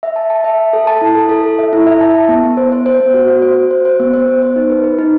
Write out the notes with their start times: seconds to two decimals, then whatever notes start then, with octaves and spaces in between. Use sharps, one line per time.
0.03 E5
0.16 A5
0.30 A5
0.44 E5
0.58 A5
0.73 A4
0.87 A5
1.01 E4
1.15 A4
1.29 A4
1.44 A4
1.59 E5
1.73 E4
1.87 E5
2.01 A5
2.15 A5
2.29 B3
2.44 B3
2.57 C5
2.72 C5
2.86 C5
3.00 B3
3.14 F#4
3.28 F#4
3.42 C5
3.57 F#4
3.71 C5
3.85 C5
4.00 B3
4.14 C5
4.28 B3
4.42 C5
4.56 D#4
4.70 B4
4.84 B4
4.99 D#4